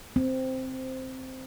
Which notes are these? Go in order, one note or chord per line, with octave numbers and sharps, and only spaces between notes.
C4